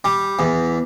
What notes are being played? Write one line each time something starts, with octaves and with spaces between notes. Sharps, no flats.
G3
E2